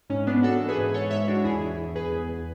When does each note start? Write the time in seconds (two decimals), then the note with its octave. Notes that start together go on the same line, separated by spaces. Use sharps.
0.09 G#2 C#4
0.27 G#2 B3 D4
0.43 E3 F#4 A4
0.60 E3
0.68 G#4 B4
0.78 G#2
0.94 G#2 A4 C#5
1.11 G#2 C#5 E5
1.27 E3 D4 F#4
1.44 E2 E4 G#4
1.61 E3
1.78 E2
1.95 E2 G#4 B4
2.12 E2
2.29 E2